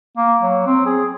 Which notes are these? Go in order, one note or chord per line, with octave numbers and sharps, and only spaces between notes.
A#3
F#3
C4
G#4